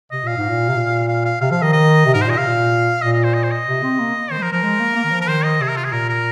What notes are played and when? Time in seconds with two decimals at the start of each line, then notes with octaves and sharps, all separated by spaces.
0.11 C3 D#5
0.24 A#2 F5
0.37 G#2
0.49 A#2
0.69 C3
0.76 A#2
1.08 F5
1.25 F5
1.41 C3 F5
1.52 F3 F5
1.62 D#3 D#5
1.73 D#5
2.06 C3
2.14 G#2 A#4
2.22 C5
2.27 A#2 D#5
2.38 C3 F5
2.48 A#2
3.02 A#2 D#5
3.13 D#5
3.24 C5
3.34 D#5
3.43 C5
3.51 D#5
3.67 C3
3.83 C4
4.00 A#3
4.31 D#3 C5
4.38 G#3
4.42 F3 A#4
4.52 F3 A#4
4.63 G#3
4.80 A#3
4.96 A#3
5.04 D#3
5.12 F3
5.21 A#4
5.28 D#3 C5
5.44 D#5
5.60 C3 G#4
5.68 A#4
5.76 F4
5.84 G#4
5.93 A#2 A#4
6.09 A#4